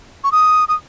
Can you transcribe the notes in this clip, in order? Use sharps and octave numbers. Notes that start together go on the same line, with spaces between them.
C#6
D#6
D#6